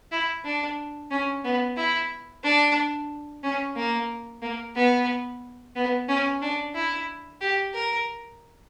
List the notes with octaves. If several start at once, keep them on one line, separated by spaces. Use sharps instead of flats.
E4
D4
C#4
B3
E4
D4
C#4
A#3
A#3
B3
B3
C#4
D4
E4
G4
A#4